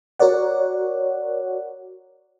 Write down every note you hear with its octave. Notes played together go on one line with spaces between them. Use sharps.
F#4 A#4 C#5 D5 F#5